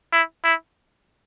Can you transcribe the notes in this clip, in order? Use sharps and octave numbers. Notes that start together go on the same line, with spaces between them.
E4
E4